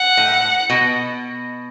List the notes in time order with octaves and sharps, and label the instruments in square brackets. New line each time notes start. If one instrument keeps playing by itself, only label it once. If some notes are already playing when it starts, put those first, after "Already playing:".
Already playing: [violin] F#5
[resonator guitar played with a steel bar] A2
B2